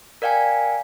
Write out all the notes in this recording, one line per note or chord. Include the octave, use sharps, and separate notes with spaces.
A#4 D5 F5 G5 G#5